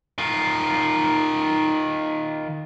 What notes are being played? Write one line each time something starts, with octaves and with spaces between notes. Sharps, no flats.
D#3 F4